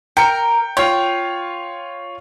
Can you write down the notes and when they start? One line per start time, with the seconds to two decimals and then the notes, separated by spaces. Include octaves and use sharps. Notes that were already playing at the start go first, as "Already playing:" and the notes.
0.17 A#4 G5 C#7
0.77 F4 C#5 G5